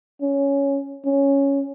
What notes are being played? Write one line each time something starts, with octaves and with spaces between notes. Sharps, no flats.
C#4
C#4